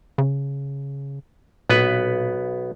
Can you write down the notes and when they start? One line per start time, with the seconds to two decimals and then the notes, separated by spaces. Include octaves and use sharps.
0.18 C#3
1.69 B1 A#2 B3 B4